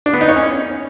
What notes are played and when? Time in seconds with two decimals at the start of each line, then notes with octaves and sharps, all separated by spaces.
0.06 D4
0.13 B3
0.21 D#4
0.29 C#5
0.36 C#4